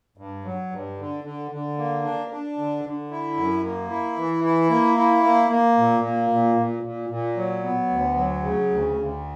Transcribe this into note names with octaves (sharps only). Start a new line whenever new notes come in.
G2
F#3
G2
D3
D3
D3
A#3
D4
D4
D3
D3
E4
F#2
A#3
E4
E3
E4
A#3
E4
A#3
A#3
A#2
A#3
A#2
A#2
A#2
A#2
F#3
B3
D2
F#3
C#3
D2
D2